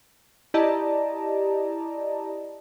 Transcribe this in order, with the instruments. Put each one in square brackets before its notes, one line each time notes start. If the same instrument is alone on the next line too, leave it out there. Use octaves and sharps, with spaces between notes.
[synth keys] E4 G4 D5 D#5 A5 A#5